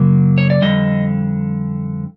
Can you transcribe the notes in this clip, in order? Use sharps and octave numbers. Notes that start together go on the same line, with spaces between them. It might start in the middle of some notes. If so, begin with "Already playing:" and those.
Already playing: F#2 C#3 F#3 A#3
C#5
D5
F2 D3 G3 D#5